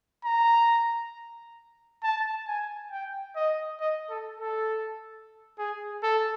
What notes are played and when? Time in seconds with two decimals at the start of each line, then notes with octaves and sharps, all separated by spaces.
0.25 A#5
2.03 A5
2.48 G#5
2.92 G5
3.36 D#5
3.81 D#5
4.10 A4
4.40 A4
5.59 G#4
6.03 A4